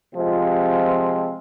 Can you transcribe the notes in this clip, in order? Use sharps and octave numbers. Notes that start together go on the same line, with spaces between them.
C3 F3 G#3 C4 F4